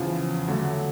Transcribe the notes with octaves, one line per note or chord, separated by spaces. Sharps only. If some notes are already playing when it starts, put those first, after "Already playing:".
Already playing: E2 C#3 F3
D3 F#3 A3